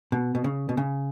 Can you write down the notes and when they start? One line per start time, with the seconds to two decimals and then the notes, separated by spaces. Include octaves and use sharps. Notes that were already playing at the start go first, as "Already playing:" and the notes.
0.12 B2
0.35 B2
0.44 C#3
0.69 B2
0.77 C#3